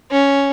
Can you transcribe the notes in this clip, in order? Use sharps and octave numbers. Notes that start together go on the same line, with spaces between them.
C#4